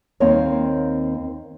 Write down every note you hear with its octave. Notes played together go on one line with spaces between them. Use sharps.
D#2 A#3 C4 A#4 C#5 D#5